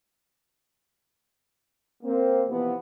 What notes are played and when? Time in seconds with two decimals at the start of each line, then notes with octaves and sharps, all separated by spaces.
2.03 A#3 C4
2.48 C3 E3 F3 B3